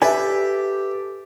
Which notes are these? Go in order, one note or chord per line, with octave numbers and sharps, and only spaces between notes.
G4 A4 B4 D5 E5 G#5